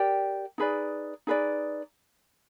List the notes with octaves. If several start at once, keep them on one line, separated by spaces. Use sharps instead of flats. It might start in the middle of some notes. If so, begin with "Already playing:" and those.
Already playing: G4 A#4 D5 G5
D#4 G#4 B4 D5
D#4 G#4 B4 D5